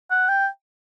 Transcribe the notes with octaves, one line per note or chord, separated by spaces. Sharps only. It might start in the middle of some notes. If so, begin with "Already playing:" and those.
F#5
G5